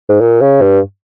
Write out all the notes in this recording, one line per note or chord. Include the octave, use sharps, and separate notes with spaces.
G#2
A#2
C#3
G2